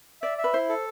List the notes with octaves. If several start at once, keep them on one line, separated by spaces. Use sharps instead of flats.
D5 E5
E5
B4
E4 C5
A4